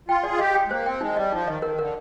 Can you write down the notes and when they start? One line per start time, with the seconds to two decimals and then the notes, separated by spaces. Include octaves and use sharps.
0.09 F4 G5
0.23 G#4 D5
0.31 F4
0.39 G4 D#5
0.54 G5
0.66 G#3
0.70 A#3 C5
0.86 C4 G5
1.01 G#3 D#4
1.16 G3 D#5
1.32 F3 D#4
1.47 D#3 D#5
1.62 D#3 A#4
1.78 D3 A#4